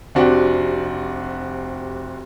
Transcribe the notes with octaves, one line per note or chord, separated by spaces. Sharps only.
F1 C4 D4 F#4 G4